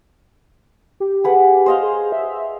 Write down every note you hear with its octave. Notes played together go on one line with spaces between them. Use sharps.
G4
G#4 B4 F#5
C5 D#5 F5
G#4
E5